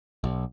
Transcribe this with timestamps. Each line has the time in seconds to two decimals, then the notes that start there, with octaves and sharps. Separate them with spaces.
0.24 B1